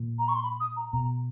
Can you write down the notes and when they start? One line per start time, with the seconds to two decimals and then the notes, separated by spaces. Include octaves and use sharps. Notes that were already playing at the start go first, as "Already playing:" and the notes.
Already playing: A#2
0.19 A#5
0.29 C#6
0.35 C6
0.43 B5
0.60 D#6
0.77 A#5
0.93 B2 A#5